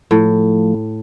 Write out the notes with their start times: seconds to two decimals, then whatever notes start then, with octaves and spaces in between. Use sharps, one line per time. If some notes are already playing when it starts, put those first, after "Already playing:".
0.11 A2 F3 A3